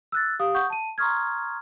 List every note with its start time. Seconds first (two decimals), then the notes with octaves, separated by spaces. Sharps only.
0.12 E6 F#6 A6
0.39 G4 F5 D#6
0.54 F#5 C#6 D#6 G6
0.70 A5 D#7
0.98 A#5 C6 C#6 D#6 F6 G#6